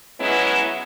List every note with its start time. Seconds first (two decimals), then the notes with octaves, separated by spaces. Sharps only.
0.20 F#3 G#3 B3 C#4 E4